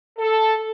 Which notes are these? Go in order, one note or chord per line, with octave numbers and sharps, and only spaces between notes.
A4